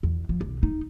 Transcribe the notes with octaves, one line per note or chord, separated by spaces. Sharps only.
E2
F3
B1
D#4